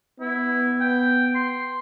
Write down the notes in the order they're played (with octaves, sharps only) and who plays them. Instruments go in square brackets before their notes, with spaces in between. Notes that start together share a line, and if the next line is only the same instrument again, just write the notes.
[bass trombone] B3 [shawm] E4
[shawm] G5
C6